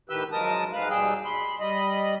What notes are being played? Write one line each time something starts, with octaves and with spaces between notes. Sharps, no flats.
A2 D#3 G4 B4 E6 G6
F#2 F3 G#3 A#4 A5 D#6
G#2 G#3 B4 F5 F#6
D#2 B2 G3 G#4 G5 E6
B5 C6
G3 D#5 B5